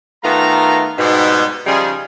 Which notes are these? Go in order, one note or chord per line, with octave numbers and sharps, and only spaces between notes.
D#3 A3 B3 F4 A#5
G#2 B2 G3
C#3 F3 G3 D#4 G#4